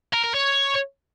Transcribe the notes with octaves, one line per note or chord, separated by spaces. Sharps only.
A#4
A#4
C#5